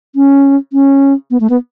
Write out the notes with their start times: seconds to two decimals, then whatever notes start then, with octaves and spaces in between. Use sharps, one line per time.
0.16 C#4
0.73 C#4
1.31 B3
1.40 A3
1.50 B3